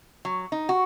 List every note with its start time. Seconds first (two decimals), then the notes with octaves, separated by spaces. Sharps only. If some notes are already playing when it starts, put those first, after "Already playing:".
0.25 F#3
0.52 D#4
0.69 F#4